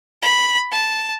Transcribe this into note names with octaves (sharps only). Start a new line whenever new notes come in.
B5
A5